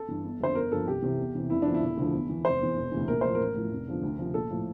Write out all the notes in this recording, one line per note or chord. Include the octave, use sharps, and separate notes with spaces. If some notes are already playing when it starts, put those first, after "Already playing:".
Already playing: A4
G2 E3
G1
F2 D3 F3 C5
G1 A#4
G2 F3 A4
C2 G4
C3 E3
E2
C3 E3
F1 E4
E2 D3 F3 D4
E4
E1
D2 D3 F3
E2
E3
F1 C5
E2 E3
E1
D2 C3 E3
A#1 A#4
A2 F3 C5
A1 A#4
A2 F3
F1
E2 D3 F3
D2
C3 F3
A#1 A4
A2 F3